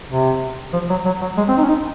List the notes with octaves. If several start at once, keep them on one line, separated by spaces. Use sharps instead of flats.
C3
F3
F#3
F#3
F#3
G#3
C4
D#4
C#4
D#4